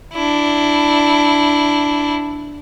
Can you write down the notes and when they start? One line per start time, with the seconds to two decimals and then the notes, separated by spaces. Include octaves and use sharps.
0.13 D4 E4